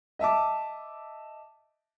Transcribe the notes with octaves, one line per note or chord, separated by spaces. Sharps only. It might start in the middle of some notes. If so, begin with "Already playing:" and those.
D#5 E5 A5 D6